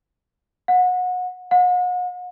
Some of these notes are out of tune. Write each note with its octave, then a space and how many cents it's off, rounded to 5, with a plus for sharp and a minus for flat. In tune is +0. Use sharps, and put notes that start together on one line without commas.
F#5 -25
F#5 -40